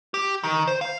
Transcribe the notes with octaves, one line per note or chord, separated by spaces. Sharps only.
G4
D#3
C5
F5